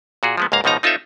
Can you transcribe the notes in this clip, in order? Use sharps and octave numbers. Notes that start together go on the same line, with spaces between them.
A#2 F#4 G#4
F3 G#3 B3
C#2 G#2 A#3 F5 A#5
C#2 B2 F3 D#4 A#5
C4 D#4 F4 A4 C#5 E5